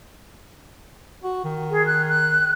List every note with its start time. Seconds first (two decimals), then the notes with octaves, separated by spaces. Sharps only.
1.24 F#4
1.44 D#3
1.71 G#4
1.86 F#6
2.08 F#6